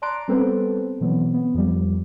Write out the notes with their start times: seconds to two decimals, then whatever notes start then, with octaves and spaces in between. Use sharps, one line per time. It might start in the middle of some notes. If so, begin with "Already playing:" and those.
0.02 D5 A5 A#5 C6 F#6 D7
0.28 G3 B3 C4 A4 B4 C5
1.01 B2 E3 F#3 B3 C4
1.34 B3
1.54 F2 F3 G3